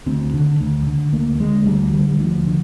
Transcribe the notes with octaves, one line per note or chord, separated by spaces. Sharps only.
D2 C4
D3
D2
D3
D2 A#3
D3 G#3
D2 G3
D3 G3
G3
D2 F3
D3